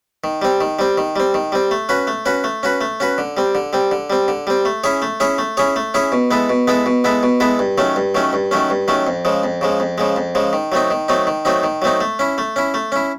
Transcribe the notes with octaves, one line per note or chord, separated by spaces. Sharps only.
D#3
G3 C4
D#3
G3 C4
D#3
G3 C4
D#3
G3 C4
A3
C#4 F#4 B4
A3
C#4 F#4 B4
A3
C#4 F#4 B4
A3
C#4 F#4 B4
D3
G3 C4
D3
G3 C4
D3
G3 C4
D3
G3 C4
A3
C#4 E4 G#4 C#5
A3
C#4 E4 G#4 C#5
A3
C#4 E4 G#4 C#5
A3
C#4 E4 G#4 C#5
B2
G#3 B3 E4 A4
B2
G#3 B3 E4 A4
B2
G#3 B3 E4 A4
B2
G#3 B3 E4 A4
G2
D#3 F#3 A3 C#4
G2
D#3 F#3 A3 C#4
G2
D#3 F#3 A3 C#4
G2
D#3 F#3 A3 C#4
F2
C#3 F3 G#3
F2
C#3 F3 G#3
F2
C#3 F3 G#3
F2
C#3 F3 G#3
D#3
F#3 A3 C4 D#4
D#3
F#3 A3 C4 D#4
D#3
F#3 A3 C4 D#4
D#3
F#3 A3 C4 D#4
A3
C#4 E4
A3
C#4 E4
A3
C#4 E4